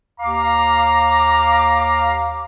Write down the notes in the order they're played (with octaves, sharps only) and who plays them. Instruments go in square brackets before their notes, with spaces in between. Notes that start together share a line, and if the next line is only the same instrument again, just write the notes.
[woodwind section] D#2 F5 D6 [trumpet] A#5